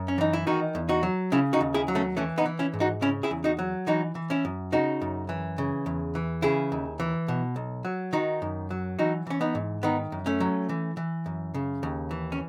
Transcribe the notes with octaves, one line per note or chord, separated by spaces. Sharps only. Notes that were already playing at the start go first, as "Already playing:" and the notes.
Already playing: F#2
C#4
E3 D#4
E4
D#3 D#4 F#4
E2
D#4 F#4
F#3
C#3 C#4 E4
D#4 F#4
D#2
E4 G#4
F#3
A3 C#4
E3 A3 C#4
B3 D#4
E3
C#4 E4
G#2
D#4 F#4
C#3 C#4 E4
E4 G#4
E2
D#4 F#4
F#3
E3 D#4 F#4
E3
C#4 E4
F#2
C#3 D#4 F#4
F#2
E3
C#3
E2
E3
C#3 E4 G#4
D#2
E3
B2
B1
F#3
D#3 D#4 F#4
F#2
F#3
E3 D#4 F#4
E3 C#4
B3 D#4
G#2
D#3 B3 D#4
F#2
A3 C#4
F#3
E3
E3
F#2
C#3
D#2
E3
C#4